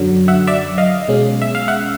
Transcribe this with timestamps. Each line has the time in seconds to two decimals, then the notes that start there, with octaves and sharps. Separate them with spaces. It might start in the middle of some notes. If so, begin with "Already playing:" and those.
Already playing: F#2 D3 F#3
0.28 E5 F#5
0.47 D5 E5
0.78 D#5 F5
1.08 B2 G#3 C#4
1.42 E5
1.55 F5
1.68 E5 F#5